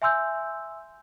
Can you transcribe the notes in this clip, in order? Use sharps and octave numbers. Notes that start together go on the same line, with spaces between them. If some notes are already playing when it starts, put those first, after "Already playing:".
E5 G#5 C6 E6 G6